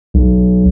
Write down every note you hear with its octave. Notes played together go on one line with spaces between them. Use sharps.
B1